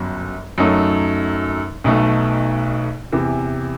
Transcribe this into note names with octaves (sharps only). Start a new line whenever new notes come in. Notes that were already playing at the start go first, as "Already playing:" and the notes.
Already playing: G1 F#2 F#3
F#2 F#3 A3 D#4 A4
B1 B2 A3 D#4
E2 C3 E3